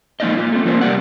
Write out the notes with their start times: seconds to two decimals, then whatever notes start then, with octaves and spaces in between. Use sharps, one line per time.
0.20 F3 G#3 A#3 D#4 D5 D#5
0.35 A#3 F4
0.52 A3 C4
0.65 A2 F3 A#3 C#4 A#4 C5
0.81 C3 G3 G4 D5 F#5